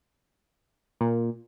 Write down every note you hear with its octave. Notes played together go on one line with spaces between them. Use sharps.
A#2